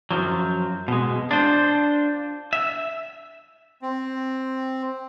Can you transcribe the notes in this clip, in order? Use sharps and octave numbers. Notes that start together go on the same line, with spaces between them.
F#2 F3 F#3
B2 G#3
D4 F4 C5
E5
C4